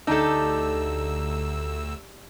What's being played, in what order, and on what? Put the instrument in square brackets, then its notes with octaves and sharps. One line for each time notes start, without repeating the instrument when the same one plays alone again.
[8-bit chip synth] D2 E6 [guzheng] D4 G4 [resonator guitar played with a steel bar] D#4 A4